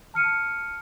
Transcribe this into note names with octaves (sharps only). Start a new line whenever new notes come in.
A5 F6 C#7 D#7